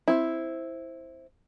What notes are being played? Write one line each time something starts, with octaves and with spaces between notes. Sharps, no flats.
C4 E4